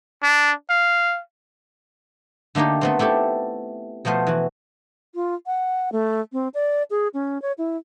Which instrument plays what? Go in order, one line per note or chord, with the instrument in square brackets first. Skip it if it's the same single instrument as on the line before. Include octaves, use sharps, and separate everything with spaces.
[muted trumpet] D4
F5
[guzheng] D3 A3 A#3 D#4 G4
A3 B3 C4
A3 E4 G4 A4
B2 F3 A3 B3 C5
E3 F#4
[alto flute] F4
F#5
A3
C4
D5
G#4
C#4
C#5
E4